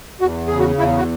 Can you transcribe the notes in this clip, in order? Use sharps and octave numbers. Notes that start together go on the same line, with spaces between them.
E2 F#4
C#3 G#4
F#4
E2 E4
F#4